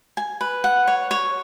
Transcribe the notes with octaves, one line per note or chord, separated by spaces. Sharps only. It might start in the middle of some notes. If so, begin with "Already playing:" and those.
G#5
B4
F#5
C#5
C#5